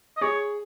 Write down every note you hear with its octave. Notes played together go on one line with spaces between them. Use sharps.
D#5
G#4 C#5